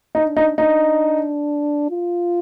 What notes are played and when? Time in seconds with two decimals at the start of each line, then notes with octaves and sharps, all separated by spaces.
0.15 D#4
0.25 D4
0.37 D#4
0.58 D4 D#4
1.90 F4